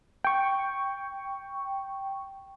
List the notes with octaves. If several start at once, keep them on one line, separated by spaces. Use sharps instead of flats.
G5 C#6